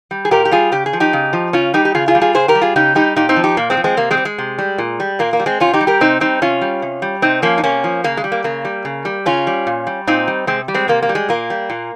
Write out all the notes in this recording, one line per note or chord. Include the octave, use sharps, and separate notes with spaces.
G3
G#4
A#2 G4 A#4
G4
G3 F4 G#4
C#3 G4
G#4
F3
D#4 G4
C#3
F3
C#3 C#4 F4
G3 D#4 G4
G4
C#3 F4 G#4
F4 G#4
G3
F4 G#4
C#3 G#4 C5
G4 A#4
G3
F4 G#4
C#3 D#4 G4
G3 D#4 G4
A#2 D#4 G4
C4 D#4
F3
D#4 G4
A#2 A#3
G#3 C4
F3
G#3 C4
C3 A#3
G#3 C4
G3
G#3
C3
G3
A#2
G3
A#2 A#3
A#3
G3
G#3 C4
C3 C#4 F4
D#4 G4
G3
G4 A#4
C3 C4 D#4
G3 C4 D#4
C3 C#4 F4
G3
C3
G3
C3 C4 D#4
F3 A#3 C#4
D#4
C3 A#3 C#4
F3
C#3 A#3
G#3
G3
A#3
C#3 A#3
G3
C#3
G3
C#3 C#4 F4
G3
A#2
G3
A#2 C4 D#4
G3
C3 G#3 C4
G3
G#3 C4
C3 A#3
A#3
G3
G#3
A#2 A#3
G3
A#2